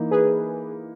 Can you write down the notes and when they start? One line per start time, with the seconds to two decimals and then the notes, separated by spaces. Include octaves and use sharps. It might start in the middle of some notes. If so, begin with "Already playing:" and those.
Already playing: E3 A#3 D#4
0.11 G#4 B4